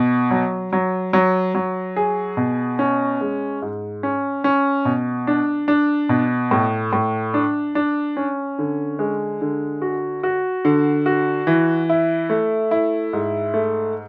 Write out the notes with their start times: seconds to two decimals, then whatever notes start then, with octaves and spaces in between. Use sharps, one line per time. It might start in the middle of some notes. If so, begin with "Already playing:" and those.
Already playing: B2
0.31 F#3
0.73 F#3
1.13 F#3
1.55 F#3
1.96 G#4
2.37 B2
2.79 C#4
3.21 G#3
3.62 G#2
4.03 C#4
4.44 C#4
4.85 B2
5.27 D4
5.68 D4
6.09 B2
6.51 A2
6.93 A2
7.34 D4
7.75 D4
8.17 C#4
8.59 D3
8.99 G#3
9.41 D3
9.82 F#4
10.23 F#4
10.65 D3
11.06 F#4
11.47 E3
11.89 E4
12.30 A3
12.71 E4
13.13 G#2
13.54 A3